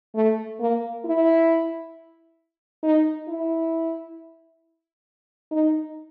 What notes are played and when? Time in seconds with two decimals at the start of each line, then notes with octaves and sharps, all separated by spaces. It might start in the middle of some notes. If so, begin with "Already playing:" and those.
0.15 A3
0.60 A#3
1.05 E4
2.83 D#4
3.28 E4
5.51 D#4